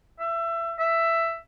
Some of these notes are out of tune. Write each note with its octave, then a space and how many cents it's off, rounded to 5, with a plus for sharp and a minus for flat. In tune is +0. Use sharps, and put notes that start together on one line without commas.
E5 +25
E5 +10